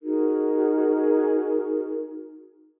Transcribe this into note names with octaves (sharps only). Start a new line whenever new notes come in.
D#4 F#4 G#4 A#4